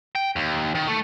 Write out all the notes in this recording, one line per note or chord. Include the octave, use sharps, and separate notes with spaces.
G5
D#2
D#3
A3